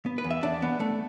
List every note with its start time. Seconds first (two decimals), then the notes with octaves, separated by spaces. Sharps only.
0.06 B3
0.18 B4
0.24 E2
0.30 E5
0.43 E2 D4
0.62 B3
0.80 A3